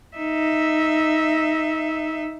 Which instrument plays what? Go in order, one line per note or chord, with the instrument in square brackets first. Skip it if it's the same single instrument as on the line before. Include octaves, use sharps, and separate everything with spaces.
[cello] D#4 E5